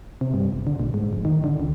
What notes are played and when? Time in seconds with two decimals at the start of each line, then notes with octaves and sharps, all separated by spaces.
0.21 C3
0.34 G2
0.53 G1
0.67 D3
0.80 A#1
0.94 G#2
1.13 F1
1.25 D#3
1.44 D3
1.60 C#2